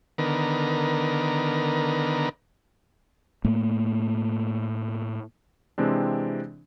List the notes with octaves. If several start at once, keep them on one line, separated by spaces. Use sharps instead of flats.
D3 D#3 B3 A#4
A2 A3 A#3
C3 E3 G#3 C4 D4